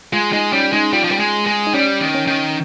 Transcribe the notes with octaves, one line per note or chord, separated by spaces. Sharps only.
G#3 F4
G#3 D#4
G3 C#4
G#3 D#4
G3 F4
F3
G3
G#3
G#3
D#4
G3 C#4
D#3
C#4
D#3